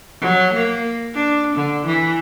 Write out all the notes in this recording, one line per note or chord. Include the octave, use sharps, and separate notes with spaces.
F#3
A#3
D4
D3
E3